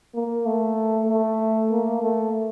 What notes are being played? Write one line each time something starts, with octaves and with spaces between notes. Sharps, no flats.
A#3
A3
A3
A#3
A3